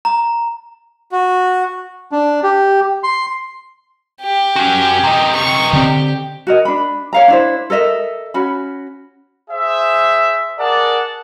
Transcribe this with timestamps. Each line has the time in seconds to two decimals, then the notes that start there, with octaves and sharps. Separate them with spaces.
0.05 A#5
1.12 F#4
2.12 D4
2.43 G4
3.03 C6
4.21 G4
4.56 C#4 F#4
5.04 C3 D#5
5.35 C#6
5.73 D3 C4 G4
6.47 F#4 A#4 D#5
6.65 D4 B5
7.13 C#5 F5 A#5
7.28 D4 E4 C5
7.70 A4 A#4 D#5 E5
8.34 C#4 F#4 B5
9.50 G#4 C5 E5
10.58 G#4 A#4 D5 F#5 A5